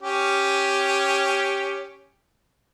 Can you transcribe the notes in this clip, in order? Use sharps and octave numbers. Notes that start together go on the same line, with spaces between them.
C#4 G4